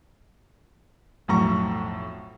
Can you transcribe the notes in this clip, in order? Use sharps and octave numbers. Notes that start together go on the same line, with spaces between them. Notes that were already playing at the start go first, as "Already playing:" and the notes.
B1 F2 A2 A#5 C#6